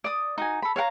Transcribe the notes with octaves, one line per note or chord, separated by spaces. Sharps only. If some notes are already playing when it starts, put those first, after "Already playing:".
D5 D#6
D#4 F#4 G#5
A4 B5
C#5 F5 F#5 A#5